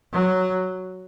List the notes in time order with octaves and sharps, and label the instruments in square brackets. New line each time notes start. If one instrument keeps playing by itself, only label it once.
[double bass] F#3